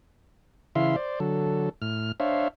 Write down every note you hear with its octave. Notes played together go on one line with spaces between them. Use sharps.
C#3 E3 E4 E5 F5 C6
C5 D5
D3 F#3 A4
A2 F6
D4 C5 C#5 E5 F5